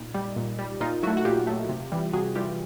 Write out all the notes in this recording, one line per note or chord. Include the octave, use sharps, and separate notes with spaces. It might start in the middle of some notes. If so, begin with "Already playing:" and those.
Already playing: A#2 D#4
G3
A#2
G3
A#2 D#4 F4
F#3 A3 E4 F#4
F#4
A#2 F4 G4
F#3 A3
C3
E3 G3
C3 F#4 G#4
E3 G3 F4 G4